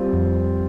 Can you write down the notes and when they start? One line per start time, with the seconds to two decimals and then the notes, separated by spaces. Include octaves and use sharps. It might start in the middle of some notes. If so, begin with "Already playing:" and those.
Already playing: G3 C4 F4
0.13 F2